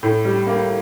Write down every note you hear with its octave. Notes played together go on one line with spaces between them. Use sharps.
A2
G3
A#3